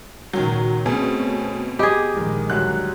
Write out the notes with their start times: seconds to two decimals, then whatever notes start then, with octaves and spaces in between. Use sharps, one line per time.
0.33 C#2 A#2 D#3 F#3
0.86 B2 A3 C4 C#4 G#4
1.79 G4 G#4 D#5 B5 D6
2.13 A#1 D#3 G#3
2.50 D2 F#3 G3 F#6